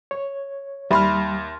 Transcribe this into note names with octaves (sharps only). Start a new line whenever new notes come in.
C#5
D#2 G3 E5 B5 C6 F6